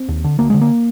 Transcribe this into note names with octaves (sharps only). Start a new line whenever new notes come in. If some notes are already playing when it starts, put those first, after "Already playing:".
Already playing: C4
D#2
D3
D2 A#3
D3 G#3
A#3